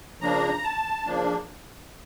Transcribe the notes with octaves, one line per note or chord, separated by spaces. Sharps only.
C#3 F3 A#3 D4 A#5
A5
C#3 F3 A#3 D4